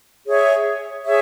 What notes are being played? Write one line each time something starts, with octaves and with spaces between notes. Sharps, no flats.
G#4 C#5 E5
G#4 C#5 E5